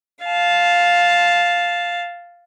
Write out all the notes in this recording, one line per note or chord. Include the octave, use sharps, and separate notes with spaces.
F5 A5